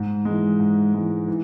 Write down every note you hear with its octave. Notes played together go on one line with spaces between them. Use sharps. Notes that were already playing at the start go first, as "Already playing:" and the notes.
Already playing: G#2
E3 G#3
G#2
E3 G#3
E3